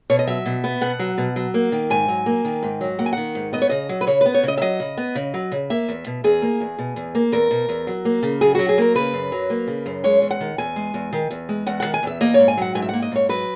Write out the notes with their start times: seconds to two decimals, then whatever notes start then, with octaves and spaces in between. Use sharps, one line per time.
0.10 B2 C#5
0.19 D#5
0.27 F#3 E5
0.46 B2
0.64 B3
0.81 B2 F#5
0.99 F#3
1.18 B2
1.36 F#3
1.54 A#3
1.72 D#3
1.90 G#2 G#5
2.08 F#3
2.26 A#3
2.45 D#3
2.63 G#2
2.81 F#3
2.99 A#3 F#5
3.06 G#5
3.13 D#3 F#5
3.35 G#2
3.53 B3 D#5
3.62 C#5
3.69 C#3 D#5
3.89 F#3
4.01 B4
4.07 C#3 C#5
4.21 B3 B4
4.34 C#5
4.43 C#3 D#5
4.58 E5
4.61 F#3 D#5
4.80 C#3
4.97 B3
5.15 C#3
5.34 F#3
5.52 C#3
5.70 A#3 E5
5.88 E2
6.07 B2
6.24 E2 G#4
6.42 A#3
6.60 E2
6.79 B2
6.96 E2
7.15 A#3
7.32 E2 A#4
7.51 B2
7.69 E2
7.87 F#3
8.05 A#3
8.23 C#3
8.41 F#2 G#4
8.55 F#3 F#4
8.69 G#4
8.78 A#3 A#4
8.95 C#3 B4
9.13 F#2
9.32 F#3
9.50 A#3
9.67 C#3
9.86 F#2
10.04 G#3 C#5
10.22 E2
10.31 F#5
10.41 D#3
10.58 E2 G#5
10.76 G#3
10.94 E2
11.13 D#3
11.31 E2
11.49 G#3
11.66 E2 F#5
11.80 D#3 F#5
11.94 G#5
12.03 E2 E5
12.21 A#3 D#5
12.34 G#2 C#5
12.48 G#5
12.57 F#3 F#5
12.75 G#2 G#5
12.82 E5
12.89 A#3 F#5
13.02 D#5
13.12 G#2 C#5
13.29 F#3 B4